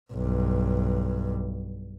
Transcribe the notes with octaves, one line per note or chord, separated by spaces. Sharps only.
B1 G2